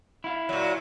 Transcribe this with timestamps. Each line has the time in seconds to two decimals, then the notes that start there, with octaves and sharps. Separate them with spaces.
0.24 E4 F5
0.49 A#2 F#3